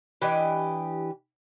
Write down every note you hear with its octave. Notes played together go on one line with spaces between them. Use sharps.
E3 D4 G4 D#5